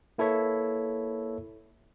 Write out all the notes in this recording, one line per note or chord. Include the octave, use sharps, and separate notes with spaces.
A#3 E4 A4 B4 C#5 E5